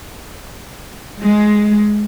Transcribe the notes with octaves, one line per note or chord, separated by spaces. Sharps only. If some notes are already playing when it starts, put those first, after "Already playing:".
G#3